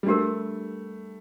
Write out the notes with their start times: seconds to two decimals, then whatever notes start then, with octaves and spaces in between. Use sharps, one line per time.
0.03 G3
0.06 A3 D4 G4 A#4